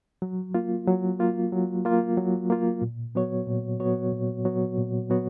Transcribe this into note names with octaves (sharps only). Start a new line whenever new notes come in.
F#3
A#3 F4
F#3
A#3 F4
F#3
A#3 F4
F#3
A#3 F4
A#2
F#3 B3 F#4 C#5
A#2
F#3 B3 F#4 C#5
A#2
F#3 B3 F#4 C#5
A#2
F#3 B3 F#4 C#5